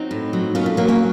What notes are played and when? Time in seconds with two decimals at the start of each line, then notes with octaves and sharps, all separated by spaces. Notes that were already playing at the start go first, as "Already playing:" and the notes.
Already playing: F#3 C4 D#4
0.11 A2
0.33 F#3
0.55 A#2 C#4 F4
0.66 A3
0.77 F#3 A#3
0.88 A#3 C#4